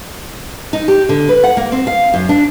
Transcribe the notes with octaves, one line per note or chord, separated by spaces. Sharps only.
D#4
G4
D3
B4
F#5
A#3
C4
F5
F#2
D4